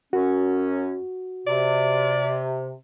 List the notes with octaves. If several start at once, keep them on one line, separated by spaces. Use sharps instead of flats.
F#2 C#4 F#4
C3 D5